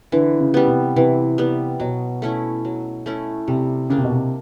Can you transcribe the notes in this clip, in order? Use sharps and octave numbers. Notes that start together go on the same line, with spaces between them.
D3 E3
C#3
G3 B3
C3
C3 E3
G3 B3
B2 F#3
A3 C#4 E4
F#3
A3 C#4 E4
C3 G3
C#3 A#3 D4
C3
B2
C3